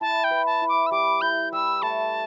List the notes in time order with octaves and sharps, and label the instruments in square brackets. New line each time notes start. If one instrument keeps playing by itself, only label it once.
[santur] E4 [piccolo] A5
[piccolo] G5
[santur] B4
[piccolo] A5
[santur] E4
[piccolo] D6
E6
[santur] G3 [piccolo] D6
[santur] E4 [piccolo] G6
[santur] G3 [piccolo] E6
[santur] A3 [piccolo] A5